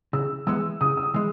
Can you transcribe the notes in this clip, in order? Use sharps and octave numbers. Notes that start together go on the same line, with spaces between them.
C#3 E6
E3 G#3 B3 E6
C#3 D#6
E6
D#6
E3 G#3